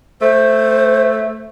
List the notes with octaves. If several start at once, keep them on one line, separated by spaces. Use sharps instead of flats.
A3 C5